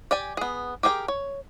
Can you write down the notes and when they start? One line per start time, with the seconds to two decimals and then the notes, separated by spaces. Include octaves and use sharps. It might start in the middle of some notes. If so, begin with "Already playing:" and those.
0.11 G4 D5 G#5
0.37 B3 G#4
0.83 G4 G#4 A#4 G5
1.08 C#5